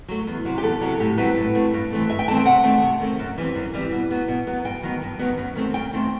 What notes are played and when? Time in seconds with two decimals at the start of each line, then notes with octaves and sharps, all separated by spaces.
0.08 F#3 A3
0.27 E2
0.45 C3 F#3
0.58 G4
0.63 E2 A4
0.81 C3 F#3
1.00 A2 G4
1.18 F#3 A3 C4 B4
1.36 A2
1.55 F#3 A3 C4
1.73 G2
1.91 E3 A3 C4
2.09 G2 E5
2.19 G5
2.28 E3 A3 C4 A5
2.37 G5
2.45 C3 F#5
2.64 D#3 A3 C4
2.82 C3
3.00 D#3 A3 C4
3.19 F#2
3.38 E3 G3 C4
3.55 F#2
3.74 E3 G3 C4
3.91 B2
4.11 F#3 B3
4.28 B2
4.47 F#3 B3
4.65 G2 G5
4.83 D#3 F#3 B3
5.02 G2
5.19 D#3 F#3 B3
5.38 F#2
5.55 D#3 A3 C4
5.74 F#2 G5
5.93 D#3 A3 C4